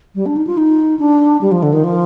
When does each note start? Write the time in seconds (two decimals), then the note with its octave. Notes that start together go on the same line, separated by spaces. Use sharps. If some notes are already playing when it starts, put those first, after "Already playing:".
0.15 G3
0.26 D4
0.36 D#4
0.47 F4
0.58 D#4
0.99 D4
1.41 G3
1.52 F3
1.63 D3
1.73 D#3
1.84 F3